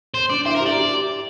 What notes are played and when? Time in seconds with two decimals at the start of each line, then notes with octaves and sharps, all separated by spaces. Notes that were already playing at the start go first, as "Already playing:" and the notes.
0.14 C5
0.30 D4 D5
0.45 E4 C5
0.55 A#4
0.61 G4
0.66 D5
0.76 G4